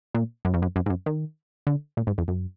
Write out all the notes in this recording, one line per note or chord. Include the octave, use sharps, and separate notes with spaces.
A#2
F#2
F2
F#2
F#2
G#2
F#2
D#3
D3
A#2
G#2
F2
F#2